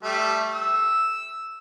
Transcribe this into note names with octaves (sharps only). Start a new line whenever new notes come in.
G3 A3
E6